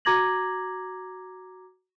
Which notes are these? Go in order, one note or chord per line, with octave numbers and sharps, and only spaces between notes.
F#4 A#5 D6 G#6 A#6 F#7